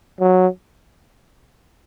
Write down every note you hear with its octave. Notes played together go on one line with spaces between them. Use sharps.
F#3